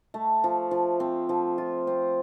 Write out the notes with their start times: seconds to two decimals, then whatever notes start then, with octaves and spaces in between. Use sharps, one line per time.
0.14 A3
0.44 F3
0.71 F3
1.00 C4
1.29 F3
1.58 F4
1.87 C4